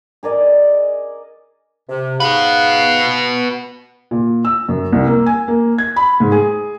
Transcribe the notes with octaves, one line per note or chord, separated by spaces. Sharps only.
G#4 A#4 D5 D#5
C3
G#2 F#4 B4 F5 F#5
A#2
E6
F#2
C2
A#3
G#5
A#3
G#6
B5
G#2
G#4